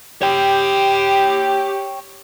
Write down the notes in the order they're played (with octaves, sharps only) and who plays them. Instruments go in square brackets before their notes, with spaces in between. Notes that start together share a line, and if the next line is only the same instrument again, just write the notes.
[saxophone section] G4 [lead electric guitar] C#5 G5